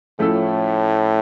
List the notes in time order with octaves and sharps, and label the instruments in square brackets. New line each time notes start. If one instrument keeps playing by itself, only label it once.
[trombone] A2 [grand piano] F3 A3 C#4 E4 A4